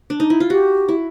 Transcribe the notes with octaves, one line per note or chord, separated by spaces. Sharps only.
D4
D#4
E4
F4
F#4 G4
E4